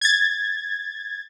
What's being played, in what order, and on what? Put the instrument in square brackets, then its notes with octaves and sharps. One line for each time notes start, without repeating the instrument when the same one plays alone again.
[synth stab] G#6 A6